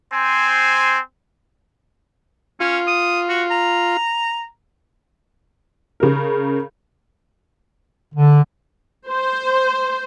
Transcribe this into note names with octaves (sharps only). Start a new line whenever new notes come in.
C4 C5 G#5
C#4 F4
D#6
F#4
A#5
C#3 A#4
D3
C5